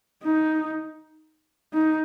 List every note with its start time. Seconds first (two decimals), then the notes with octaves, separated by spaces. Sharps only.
0.23 D#4
1.73 D#4